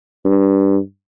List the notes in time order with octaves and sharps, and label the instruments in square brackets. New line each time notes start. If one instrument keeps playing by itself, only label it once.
[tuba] G2